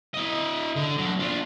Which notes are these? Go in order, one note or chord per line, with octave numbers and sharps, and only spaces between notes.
E4 D#5
D3
F#3 D4
D4 F4